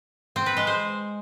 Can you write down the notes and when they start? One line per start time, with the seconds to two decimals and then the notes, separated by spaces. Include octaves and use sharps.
0.36 C4
0.46 B4
0.57 G#3
0.67 C5